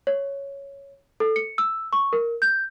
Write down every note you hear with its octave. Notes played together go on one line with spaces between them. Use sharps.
C#5
A4
C#7
E6
C#6
A#4
G6